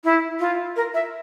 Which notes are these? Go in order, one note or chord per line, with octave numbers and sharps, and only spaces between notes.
E4
F4
A#4
E5